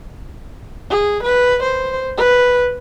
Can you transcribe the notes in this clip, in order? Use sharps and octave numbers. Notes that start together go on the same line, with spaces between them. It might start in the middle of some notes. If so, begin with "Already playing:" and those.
G#4
B4
C5
B4